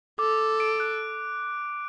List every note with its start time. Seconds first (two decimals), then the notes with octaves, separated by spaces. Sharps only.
0.19 A4 D6
0.39 D6
0.60 D7
0.80 F#6